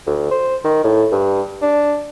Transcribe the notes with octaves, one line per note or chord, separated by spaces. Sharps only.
D2
C5
D#3
A2
G2
D4